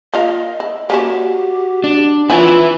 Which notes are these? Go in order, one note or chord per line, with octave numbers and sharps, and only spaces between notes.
A#3 F4 D#5 F5
E4
A#3 C#4 E4 F#4 G4
D4
C4 C#4 E4 F4 B4 G#5